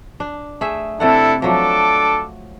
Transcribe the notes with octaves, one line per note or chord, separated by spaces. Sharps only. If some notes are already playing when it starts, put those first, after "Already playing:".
D4
A3 G#4 E5
C3 A3 D4 E4 A4 F#5
F3 F#3 D4 A4 D6